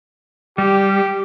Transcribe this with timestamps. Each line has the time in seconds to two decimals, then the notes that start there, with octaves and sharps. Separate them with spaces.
0.58 G3 G4